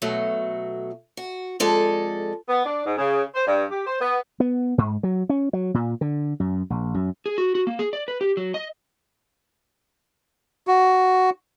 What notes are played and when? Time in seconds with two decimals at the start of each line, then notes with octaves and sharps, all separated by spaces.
0.02 B2 F#3 A3
1.17 F#4
1.60 F2 G#3 A4 D5
2.48 B3
2.65 D4
2.84 G#2
2.98 C#3
3.34 C5
3.46 G2
3.70 G4
3.86 C5
4.00 B3
4.40 B3
4.78 G#2
5.03 F#3
5.29 C#4
5.53 F#3
5.74 A#2
6.01 D3
6.40 F#2
6.70 A#1
6.94 F#2
7.26 G#4
7.38 F#4
7.55 F#4
7.67 A#3
7.79 G#4
7.93 D5
8.08 B4
8.21 G4
8.37 F#3
8.54 D#5
10.67 F#4